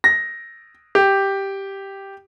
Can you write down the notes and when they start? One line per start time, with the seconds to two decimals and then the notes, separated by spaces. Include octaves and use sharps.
0.04 A#6
0.95 G4